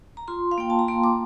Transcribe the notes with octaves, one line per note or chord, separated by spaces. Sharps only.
A#5
F4 C6
F5
A#3 G5
A5
A#5
A#3 C6
D6